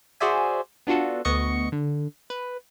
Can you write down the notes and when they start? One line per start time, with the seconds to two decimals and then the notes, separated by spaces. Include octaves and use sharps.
0.20 F#4 G#4 C5 D5 E5 G#5
0.87 B3 D4 F4 F#4 A4
1.25 D2 B3 D#5 C#6 C#7
1.72 D3
2.30 B4